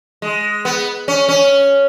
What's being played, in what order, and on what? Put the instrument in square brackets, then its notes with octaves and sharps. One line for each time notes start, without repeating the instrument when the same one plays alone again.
[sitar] G#3
B3
C#4
C#4